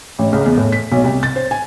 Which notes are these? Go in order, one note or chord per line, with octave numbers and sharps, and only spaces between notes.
A1
C#2
E2
A2
B6
B1
C2
A6
C5
G#5